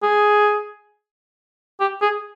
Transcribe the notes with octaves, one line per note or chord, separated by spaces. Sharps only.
G#4
G4
G#4